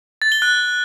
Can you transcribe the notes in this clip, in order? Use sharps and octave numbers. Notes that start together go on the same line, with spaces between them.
A6
G7
F#6